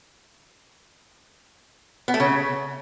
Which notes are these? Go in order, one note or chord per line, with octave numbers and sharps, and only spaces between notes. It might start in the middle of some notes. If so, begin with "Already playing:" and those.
B3
A3
C#3